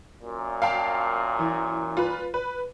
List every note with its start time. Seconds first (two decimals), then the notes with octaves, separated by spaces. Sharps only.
0.23 F#2 A#2
0.62 F5 G5 A5
1.39 E3
1.97 F4 B4
2.34 B4